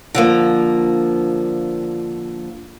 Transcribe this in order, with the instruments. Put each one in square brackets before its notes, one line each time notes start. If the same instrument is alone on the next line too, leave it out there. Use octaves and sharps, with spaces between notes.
[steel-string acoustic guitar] D3 F3 A#3